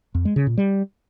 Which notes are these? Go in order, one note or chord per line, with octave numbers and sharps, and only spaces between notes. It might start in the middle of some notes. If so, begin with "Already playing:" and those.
F2
G#3
C#3
A#2
G3